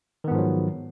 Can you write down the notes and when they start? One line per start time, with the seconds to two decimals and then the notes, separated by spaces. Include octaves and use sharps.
0.24 D#3
0.28 B3
0.31 G#2
0.35 F3
0.38 F#3